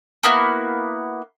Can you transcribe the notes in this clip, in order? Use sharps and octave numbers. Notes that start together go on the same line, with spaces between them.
A#3 B3 E4 F#4